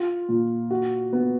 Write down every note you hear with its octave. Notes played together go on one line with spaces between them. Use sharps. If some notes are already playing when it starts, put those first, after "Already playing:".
Already playing: F4
A#2
F#4
B3